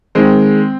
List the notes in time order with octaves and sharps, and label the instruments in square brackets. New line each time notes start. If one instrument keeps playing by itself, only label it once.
[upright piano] D#3 G#3 C4